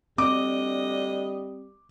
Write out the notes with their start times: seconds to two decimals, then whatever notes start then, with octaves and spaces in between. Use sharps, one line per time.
0.18 D2 G3 C4 D4 D#5 D6